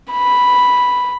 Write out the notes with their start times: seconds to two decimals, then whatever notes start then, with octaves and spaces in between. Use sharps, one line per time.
0.12 B5